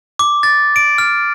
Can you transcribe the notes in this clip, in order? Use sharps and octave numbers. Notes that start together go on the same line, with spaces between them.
D6
A6
D7
F6